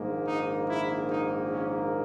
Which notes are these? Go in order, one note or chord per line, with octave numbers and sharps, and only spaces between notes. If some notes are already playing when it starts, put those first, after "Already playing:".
Already playing: A#1 G#2 D#3 A#3
D#4
E4
D#4
C#4